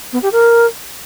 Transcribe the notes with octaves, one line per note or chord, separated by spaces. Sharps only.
B3
G4
A#4